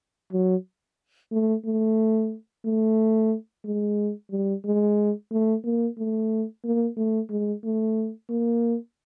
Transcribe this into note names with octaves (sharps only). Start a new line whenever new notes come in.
F#3
A3
A3
A3
G#3
G3
G#3
A3
A#3
A3
A#3
A3
G#3
A3
A#3